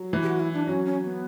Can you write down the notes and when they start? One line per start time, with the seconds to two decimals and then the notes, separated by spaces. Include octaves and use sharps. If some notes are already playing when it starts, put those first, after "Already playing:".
Already playing: F#3
0.13 E3
0.22 G4
0.27 F#4
0.40 E4
0.53 D4
0.67 F#3 C#4
0.85 C#4
1.04 B3